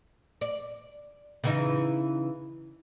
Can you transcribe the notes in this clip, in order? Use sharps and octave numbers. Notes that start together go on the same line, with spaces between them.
D5
C#3 E3 D#4